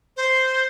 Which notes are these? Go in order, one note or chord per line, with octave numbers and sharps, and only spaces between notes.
C5